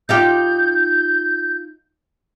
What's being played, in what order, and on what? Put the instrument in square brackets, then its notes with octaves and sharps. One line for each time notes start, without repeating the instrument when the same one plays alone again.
[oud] D#4 F4 G4 [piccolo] G6